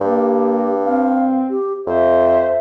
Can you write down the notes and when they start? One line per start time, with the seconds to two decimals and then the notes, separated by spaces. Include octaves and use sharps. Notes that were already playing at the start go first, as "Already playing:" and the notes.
0.01 G2 A#3 G4
0.84 C4 F5
1.50 G4
1.87 F2 C5 E5